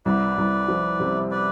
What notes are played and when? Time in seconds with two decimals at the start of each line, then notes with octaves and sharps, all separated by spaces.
0.05 C2 B4 D5
0.38 C2
0.68 F3
1.00 C3
1.31 B4 D5